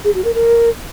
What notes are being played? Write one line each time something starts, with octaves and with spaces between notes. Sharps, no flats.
G#4
F#4
A#4
A#4